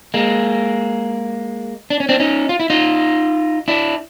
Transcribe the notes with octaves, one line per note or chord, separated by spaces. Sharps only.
G#3 A#3
D4
C#4
C4 D4
C#4 D#4
F4
E4
D#4 F4
D4 E4